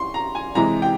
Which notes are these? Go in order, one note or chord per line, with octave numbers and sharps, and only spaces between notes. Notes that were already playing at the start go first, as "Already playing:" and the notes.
Already playing: C6 C#6
A#5
G#5
C3 E3 G#3 A#5
G5